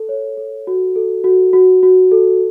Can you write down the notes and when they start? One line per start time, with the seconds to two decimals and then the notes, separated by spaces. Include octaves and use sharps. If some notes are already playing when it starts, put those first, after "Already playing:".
Already playing: A4
0.09 C#5
0.37 A4
0.67 F#4
0.96 A4
1.24 F#4
1.53 F#4
1.83 F#4
2.12 A4